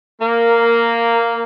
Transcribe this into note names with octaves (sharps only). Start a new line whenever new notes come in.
A#3